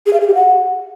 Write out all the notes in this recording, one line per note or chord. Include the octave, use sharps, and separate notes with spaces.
G#4
F5
G#4
G4
F#5